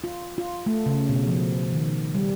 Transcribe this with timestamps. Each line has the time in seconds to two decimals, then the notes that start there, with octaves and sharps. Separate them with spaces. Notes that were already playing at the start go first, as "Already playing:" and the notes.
0.04 F4
0.38 F4
0.66 A3
0.86 C#3
1.09 B2
1.27 F3
1.72 D#3
2.15 G3